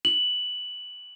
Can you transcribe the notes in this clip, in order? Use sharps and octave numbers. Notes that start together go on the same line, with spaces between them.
F#7